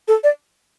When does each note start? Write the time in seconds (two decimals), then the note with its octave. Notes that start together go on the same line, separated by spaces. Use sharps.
0.08 A4
0.24 D5